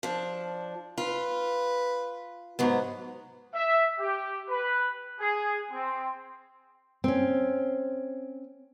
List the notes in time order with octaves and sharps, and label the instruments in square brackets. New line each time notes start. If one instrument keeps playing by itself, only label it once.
[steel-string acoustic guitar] F3 D4
[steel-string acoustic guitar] F4 [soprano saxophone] B4
[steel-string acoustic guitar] G#2 F#3 B3
[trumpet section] E5
G4
B4
G#4
C4
[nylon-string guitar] C4 C#4